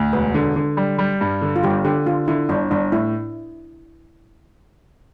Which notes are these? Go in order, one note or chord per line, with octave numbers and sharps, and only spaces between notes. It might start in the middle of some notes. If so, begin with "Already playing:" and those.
Already playing: D2
E1 B4
D3
D3
G3
G3
G2
D3
F4
G1 G4
D3 G4
D3 F4
D3 E4
G1 D4
G1 D4
A2 E4